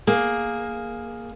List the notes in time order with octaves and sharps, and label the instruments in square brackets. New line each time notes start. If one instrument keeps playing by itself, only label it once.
[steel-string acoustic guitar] A#3 [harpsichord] G#4